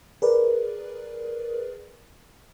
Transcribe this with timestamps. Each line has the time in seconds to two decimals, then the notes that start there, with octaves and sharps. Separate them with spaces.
0.22 G#4 A#4 B4 D5